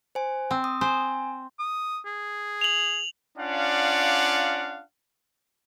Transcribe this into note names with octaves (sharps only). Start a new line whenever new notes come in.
C5 G#5
C4
D#6
C5 G#5
D#6
G#4
F7 F#7
C#4 D4 F4 D5 F5 F#5